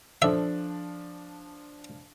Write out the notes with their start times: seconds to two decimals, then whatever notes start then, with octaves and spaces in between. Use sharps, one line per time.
0.22 F3 D4 A4 C5 E5